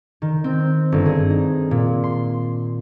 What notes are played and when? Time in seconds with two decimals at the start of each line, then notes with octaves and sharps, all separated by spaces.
0.22 D#3
0.44 C4
0.92 G1
1.06 G#4
1.30 D#4
1.71 A#2
2.04 C6